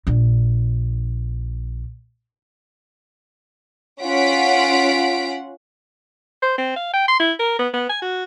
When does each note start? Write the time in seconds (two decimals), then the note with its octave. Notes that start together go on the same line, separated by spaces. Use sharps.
0.07 A#1 D4
4.03 C#4 F4 F#5 B6 D7
6.42 C5
6.58 C4
6.76 F5
6.93 G5
7.08 C6
7.20 E4
7.39 A#4
7.59 B3
7.73 B3
7.89 G#5
8.02 F#4